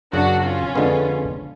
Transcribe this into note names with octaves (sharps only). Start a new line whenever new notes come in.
F#2 C#3 F#3 D4 F#4
C#4 F4
F2 D3 G#3 B3